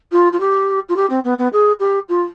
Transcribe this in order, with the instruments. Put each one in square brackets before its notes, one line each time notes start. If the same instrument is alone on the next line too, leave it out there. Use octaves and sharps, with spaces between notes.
[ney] F4
F4
G4
F4
G4
C4
B3
B3
G#4
G4
F4